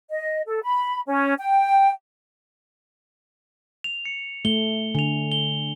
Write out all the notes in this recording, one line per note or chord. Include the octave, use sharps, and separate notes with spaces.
D#5
A4
B5
C#4
G5
F7
C#7
A3 G7
D3 G#5 F7
G7